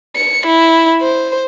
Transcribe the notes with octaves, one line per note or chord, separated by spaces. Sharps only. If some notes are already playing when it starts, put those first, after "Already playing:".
C#7
E4
C5